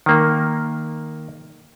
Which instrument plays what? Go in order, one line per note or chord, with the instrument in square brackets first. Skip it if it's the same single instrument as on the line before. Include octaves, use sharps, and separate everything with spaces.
[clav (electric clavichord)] D#3 A#3